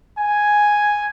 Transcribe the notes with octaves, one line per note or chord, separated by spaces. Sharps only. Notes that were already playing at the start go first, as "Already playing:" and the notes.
G#5